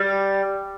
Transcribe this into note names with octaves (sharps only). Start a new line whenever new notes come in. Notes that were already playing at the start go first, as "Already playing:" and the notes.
Already playing: G3